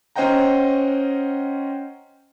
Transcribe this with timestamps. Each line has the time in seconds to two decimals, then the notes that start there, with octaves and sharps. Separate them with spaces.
0.16 C#4 C5 D#5 F#5 G5 A#5